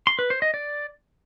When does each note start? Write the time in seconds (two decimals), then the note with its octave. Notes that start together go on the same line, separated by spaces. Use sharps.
0.07 C6
0.19 B4
0.30 C5
0.42 D#5
0.54 D5